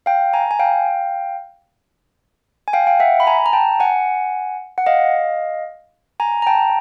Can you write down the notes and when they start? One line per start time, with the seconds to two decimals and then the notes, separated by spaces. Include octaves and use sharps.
0.06 F5 G5
0.33 G#5 A#5
0.51 G#5
0.59 F5 G5
2.68 G#5
2.73 F5 G5
2.87 F5 G5
3.00 E5 F#5
3.20 B5
3.27 G#5 A#5
3.46 A#5
3.53 G5 A5
3.80 F#5 G#5
4.78 F#5
4.86 D#5 F5
6.20 G#5 A#5
6.42 A#5
6.47 G5 A5